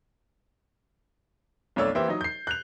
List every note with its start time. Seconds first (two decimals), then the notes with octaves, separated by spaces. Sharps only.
1.76 B1 F2 A3 C#5 D5 E6
1.95 E3 A#3 G4 C5 E5
2.08 F#3 D#4 D#5
2.21 G6 C7
2.47 F#6 G6 F7